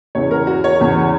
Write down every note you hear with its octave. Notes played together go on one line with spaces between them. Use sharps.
E2 C#3 E3 C#5
A#4
F#4
C#5
E2 C#3 E3